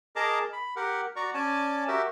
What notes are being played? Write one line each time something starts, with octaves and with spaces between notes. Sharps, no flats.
G#4 A#4 D#5 A5 A#5 D6
B5
G4 A#4 F#5
F#4 D5 A#5 C#6
C#4 D5 G#5 A5
F#4 G4 A#4 E5